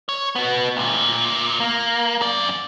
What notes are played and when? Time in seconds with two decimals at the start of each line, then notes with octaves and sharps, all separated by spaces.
0.09 C#5
0.35 B3 F#4
0.77 D2 A#2
1.60 A#3
2.21 F#2 D5